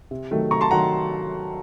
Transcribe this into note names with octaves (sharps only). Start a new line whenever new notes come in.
C3
D#3 F#3 A3
C3 A#5 C#6
A5 C6
D#3 F#3 F#5 A#5